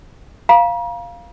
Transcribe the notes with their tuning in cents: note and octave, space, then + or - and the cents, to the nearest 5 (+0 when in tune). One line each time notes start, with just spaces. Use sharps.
F5 +0 A#5 +40